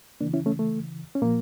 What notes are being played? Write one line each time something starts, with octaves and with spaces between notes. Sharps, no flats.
C#3 E3 A#3 D4
C#4 E4
A3 C#4
A3
C#4
A#2 F3 A#3